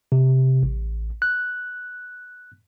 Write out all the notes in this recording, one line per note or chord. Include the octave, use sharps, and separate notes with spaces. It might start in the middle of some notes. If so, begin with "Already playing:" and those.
C3
A1
F#6